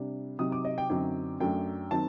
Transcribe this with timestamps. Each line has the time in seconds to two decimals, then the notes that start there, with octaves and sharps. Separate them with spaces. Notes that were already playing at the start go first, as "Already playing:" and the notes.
Already playing: C3 G3 D4
0.39 C3 F#3 C4 D#4 D#6
0.52 D6
0.65 D#5
0.78 G5
0.90 F#2 D3 F#3 C4 D#4 G5
1.40 F#2 F#3 A3 D4 G5
1.91 D#3 F#3 C4 D#4 A5